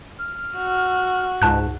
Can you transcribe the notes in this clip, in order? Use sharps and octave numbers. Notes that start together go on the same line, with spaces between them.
F6
F#4
C#2 G#2 A5 F#6